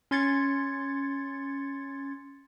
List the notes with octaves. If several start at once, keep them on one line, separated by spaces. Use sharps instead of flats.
C#4 C6 G#6 A6 C#7